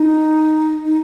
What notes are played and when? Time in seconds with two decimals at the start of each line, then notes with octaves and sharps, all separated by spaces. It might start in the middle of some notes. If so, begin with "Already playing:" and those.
Already playing: D#4
0.85 D#4